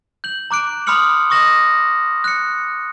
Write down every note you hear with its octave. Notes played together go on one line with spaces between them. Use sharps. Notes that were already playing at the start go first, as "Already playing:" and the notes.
G6 F#7
A#5 D6 F#6 D7
B5 C6 D#6 F6 C#7 F#7
C#6 D#6 A#6 E7 F#7
F#6 C#7